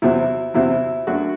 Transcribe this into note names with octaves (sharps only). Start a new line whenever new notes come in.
E2 C3 F#3 C4 E4
E2 C3 F#3 C4 E4
F#2 F#3 A3 D4 F#4